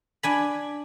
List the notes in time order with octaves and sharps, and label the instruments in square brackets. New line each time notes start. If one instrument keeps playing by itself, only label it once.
[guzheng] D4 G#5 B5